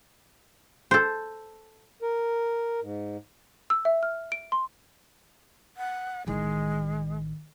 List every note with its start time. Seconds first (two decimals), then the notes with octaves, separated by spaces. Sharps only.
0.91 A4 C5
2.02 A#4
2.81 G#2
3.70 E6
3.85 E5
4.03 F6
4.32 D7
4.52 C6
5.77 F#5
6.27 A1 D#3 G#3